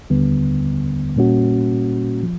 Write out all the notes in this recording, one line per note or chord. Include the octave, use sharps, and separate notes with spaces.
D#2 D3 G3 B3
A#2 G3 A#3 C#4 F#4
F3